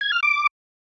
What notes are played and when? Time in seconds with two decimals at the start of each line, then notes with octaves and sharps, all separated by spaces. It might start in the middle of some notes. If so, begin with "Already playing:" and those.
0.01 G#6
0.12 F6
0.23 D6